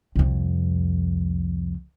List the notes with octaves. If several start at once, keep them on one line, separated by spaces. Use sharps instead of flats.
C2 F2